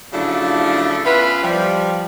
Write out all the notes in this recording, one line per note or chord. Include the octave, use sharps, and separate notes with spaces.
C#3 F3 F#3 A3 D4 E4
B3 C#4 E4 F4 B4
F3 G3